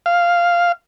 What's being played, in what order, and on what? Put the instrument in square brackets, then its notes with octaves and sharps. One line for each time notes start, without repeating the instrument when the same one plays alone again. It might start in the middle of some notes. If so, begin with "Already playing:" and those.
[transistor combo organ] F5